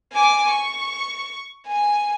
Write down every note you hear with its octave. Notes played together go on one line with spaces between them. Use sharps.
G#5 D6
C#6
G#5